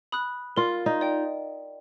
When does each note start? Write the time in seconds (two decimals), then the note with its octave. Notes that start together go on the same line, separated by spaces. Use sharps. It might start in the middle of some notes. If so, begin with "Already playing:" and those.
0.12 B5 D#6 F#6
0.57 F4 A#4
0.86 D#4
1.01 D5 G5